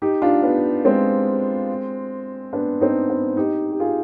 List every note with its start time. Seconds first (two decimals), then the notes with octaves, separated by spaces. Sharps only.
0.02 D#4 G4
0.22 D4 F4
0.43 B3
0.85 G#3 C4
2.53 B3 D4
2.81 C4 D#4
3.10 B3
3.37 D#4 G4
3.71 G4
3.80 F4 G#4